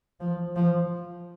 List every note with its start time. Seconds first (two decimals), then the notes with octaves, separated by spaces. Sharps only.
0.20 F3
0.56 F3